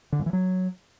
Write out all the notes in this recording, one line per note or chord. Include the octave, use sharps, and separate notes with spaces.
D3
G2
E3
F#3